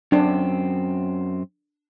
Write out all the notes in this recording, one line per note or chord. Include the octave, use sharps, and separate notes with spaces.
F#2 C4 D4